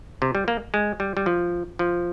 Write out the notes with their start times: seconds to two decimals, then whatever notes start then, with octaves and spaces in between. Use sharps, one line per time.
0.22 C3
0.35 G3
0.48 A#3
0.74 G#3
1.00 G3
1.17 G3
1.26 F3
1.79 F3